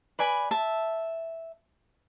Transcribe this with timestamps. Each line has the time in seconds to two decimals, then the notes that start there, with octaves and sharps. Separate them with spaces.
0.19 B4 D5 G#5 B5
0.51 E5 A5